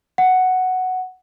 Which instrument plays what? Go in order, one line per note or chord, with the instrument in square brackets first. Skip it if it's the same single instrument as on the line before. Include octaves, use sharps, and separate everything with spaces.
[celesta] F#5